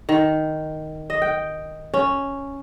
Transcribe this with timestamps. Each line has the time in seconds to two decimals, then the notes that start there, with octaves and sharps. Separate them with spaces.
0.09 D#3
1.10 D#5
1.22 G5
1.94 C#4